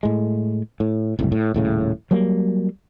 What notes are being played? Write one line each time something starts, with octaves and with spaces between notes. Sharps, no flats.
A2 G#3
A2
F#1 C2 A2
A2
D#1 A2 C#3
F#3 G3 A#3